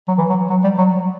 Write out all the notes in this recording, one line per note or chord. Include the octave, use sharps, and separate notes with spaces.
F#3
E3
F#3
F#3
G3
F#3